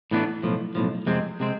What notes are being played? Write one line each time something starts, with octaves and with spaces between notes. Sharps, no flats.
A2 E3 B3 D4
B1 A2 F3
B1 A2 F3
F2 C3 G#3 C4
C3 G#3 C4